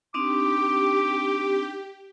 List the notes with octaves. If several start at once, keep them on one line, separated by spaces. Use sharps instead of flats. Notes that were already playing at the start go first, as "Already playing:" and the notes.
C4 D4 D#4 G4 D6